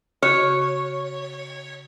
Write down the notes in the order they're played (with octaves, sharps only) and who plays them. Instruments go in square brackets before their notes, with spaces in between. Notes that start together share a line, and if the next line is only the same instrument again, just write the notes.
[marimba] C#3 F#4 [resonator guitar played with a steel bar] C#5